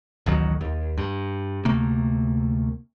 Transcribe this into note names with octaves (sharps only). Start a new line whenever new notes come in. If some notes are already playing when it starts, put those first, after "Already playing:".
A1 D2 D#3 F#3
D#2
G2
D2 C3 A3 A#3